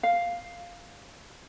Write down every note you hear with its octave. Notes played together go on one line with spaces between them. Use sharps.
F5